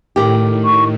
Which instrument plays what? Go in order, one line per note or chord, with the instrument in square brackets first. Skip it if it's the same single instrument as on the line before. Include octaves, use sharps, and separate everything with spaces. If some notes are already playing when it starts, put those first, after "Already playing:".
[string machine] A2 [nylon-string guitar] D#3 G4
[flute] C#6